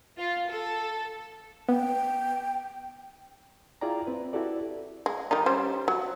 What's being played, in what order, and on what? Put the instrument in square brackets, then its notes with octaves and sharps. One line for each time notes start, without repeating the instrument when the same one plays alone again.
[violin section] F4
A4
[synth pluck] B3 [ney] G5
[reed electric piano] E4 F4 G#4 D5 G5 A#5
C4 B4
E4 F#4 G4 A4 D5
[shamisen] G#3
D#3 G3 D#4
G3 C#4 C5
F#3